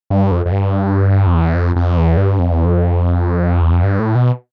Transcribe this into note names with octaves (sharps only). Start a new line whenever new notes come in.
G2
F2
F2
G2
F2
E2
F2
F2
E2
G2
F2
E2
F2
E2
F2
G2
A2
B2